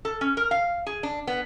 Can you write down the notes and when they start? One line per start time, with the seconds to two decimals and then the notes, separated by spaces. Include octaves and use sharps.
0.05 A4
0.21 C#4
0.37 A#4
0.51 F5
0.87 G#4
1.03 D4
1.27 B3